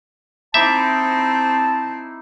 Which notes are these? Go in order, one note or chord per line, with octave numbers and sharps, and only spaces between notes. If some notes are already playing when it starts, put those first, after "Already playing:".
C4 D#4 E4 E5 A5 D6